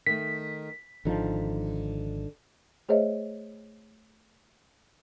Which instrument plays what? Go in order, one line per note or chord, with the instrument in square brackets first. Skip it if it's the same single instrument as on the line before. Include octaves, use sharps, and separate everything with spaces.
[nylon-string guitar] D#3 A3 [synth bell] B6
[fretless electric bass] G#1 F3 [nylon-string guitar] D3 D#4
[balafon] A3 G#4 C5 C#5 D#5 E5